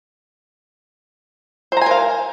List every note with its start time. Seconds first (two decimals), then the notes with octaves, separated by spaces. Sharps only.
1.72 C5
1.77 A#5
1.81 G#5
1.86 A#4
1.91 F5